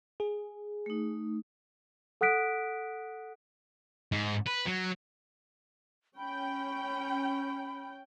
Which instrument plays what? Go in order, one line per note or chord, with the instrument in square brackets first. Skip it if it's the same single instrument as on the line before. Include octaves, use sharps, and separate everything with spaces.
[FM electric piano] G#4
[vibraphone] A3 D#4
[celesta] A4 F#5 D#6 F#6 B6 D7
[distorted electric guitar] G#2
B4
F#3
[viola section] C#4 G5 [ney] B5